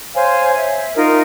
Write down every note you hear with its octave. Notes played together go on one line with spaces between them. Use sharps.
C5 C#5 F5 G#5
E5
D#4 F4 A#4 D#5